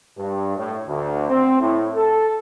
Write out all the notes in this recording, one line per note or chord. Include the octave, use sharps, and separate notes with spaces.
G2
A2
D2
C4
A2
A4